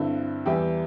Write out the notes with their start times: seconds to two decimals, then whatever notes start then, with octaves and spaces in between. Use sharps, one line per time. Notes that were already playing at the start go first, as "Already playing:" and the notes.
Already playing: G2 D3 C4 E4
0.46 E2 E3 G3 E4 G4